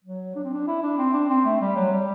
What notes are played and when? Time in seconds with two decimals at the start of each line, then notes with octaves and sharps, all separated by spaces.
0.04 F#3
0.36 D4
0.44 C4
0.53 D4
0.67 E4
0.82 D4
0.98 C4
1.14 D4
1.29 C4
1.45 A3
1.61 G3
1.76 F#3
1.92 G3